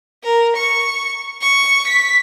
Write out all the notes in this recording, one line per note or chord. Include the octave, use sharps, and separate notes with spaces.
A#4
C#6
C#6
B6